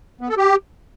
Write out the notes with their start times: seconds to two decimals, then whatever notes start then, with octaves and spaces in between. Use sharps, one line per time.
0.21 B3
0.29 A4
0.37 G4